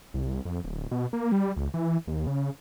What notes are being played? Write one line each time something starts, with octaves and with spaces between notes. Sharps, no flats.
C2
F2
D1
B2
A#3
G3
C#2
E3
D#2
C#3